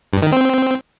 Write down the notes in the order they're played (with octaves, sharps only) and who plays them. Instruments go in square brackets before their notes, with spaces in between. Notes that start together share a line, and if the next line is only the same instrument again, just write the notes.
[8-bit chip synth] G2
D#3
C4